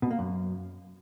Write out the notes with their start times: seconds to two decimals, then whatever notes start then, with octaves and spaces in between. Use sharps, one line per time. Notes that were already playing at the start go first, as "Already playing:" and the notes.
0.02 B2
0.11 A#3
0.19 F#2